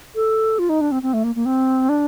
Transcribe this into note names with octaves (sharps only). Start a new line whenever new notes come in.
A4
F4
D#4
D4
C4
C4
A3
A#3
A#3
C4
D4